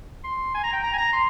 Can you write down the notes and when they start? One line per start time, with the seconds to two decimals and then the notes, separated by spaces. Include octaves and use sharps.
0.24 C6
0.54 G#5
0.63 A#5
0.73 G5
0.83 A#5
0.93 G#5
0.98 A#5
1.13 C6